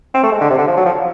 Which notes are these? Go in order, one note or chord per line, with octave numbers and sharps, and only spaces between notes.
C4
A3
G#3
D3
C3
D3
F3
F#3
F3